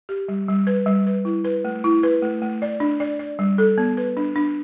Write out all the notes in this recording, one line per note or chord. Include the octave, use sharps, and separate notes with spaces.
G4
G3
G3
B4
G3
B4
E4
B4
A3
E4
B4
A3
A3
D5
D4
D5
D5
G3
A4
B3
B4
D4
D4